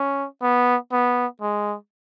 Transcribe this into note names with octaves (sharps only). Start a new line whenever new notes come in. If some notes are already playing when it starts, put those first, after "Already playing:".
Already playing: C#4
B3
B3
G#3